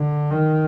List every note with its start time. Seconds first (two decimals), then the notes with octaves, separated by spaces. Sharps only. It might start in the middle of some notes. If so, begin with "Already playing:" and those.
Already playing: D3
0.30 D#3